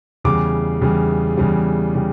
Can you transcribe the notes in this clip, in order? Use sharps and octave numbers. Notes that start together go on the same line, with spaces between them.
E2 C#3 G3 D6
E2 C#3 G3
E2 C#3 G3
C#3 G3